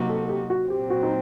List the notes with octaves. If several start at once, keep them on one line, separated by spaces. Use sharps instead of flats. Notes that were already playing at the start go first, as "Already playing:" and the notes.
Already playing: C3 F#3 A#3 D#4 F#4
A4
A4
G4
F#4
A#2 F#3 C4 G4
F#4
D#4